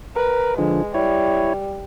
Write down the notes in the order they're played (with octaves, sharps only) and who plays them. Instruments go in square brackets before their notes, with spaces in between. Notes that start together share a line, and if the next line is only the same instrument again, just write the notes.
[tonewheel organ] A#4 [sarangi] B4
[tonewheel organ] D3 F3 [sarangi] G#3
[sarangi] G3 [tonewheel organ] E4 C#5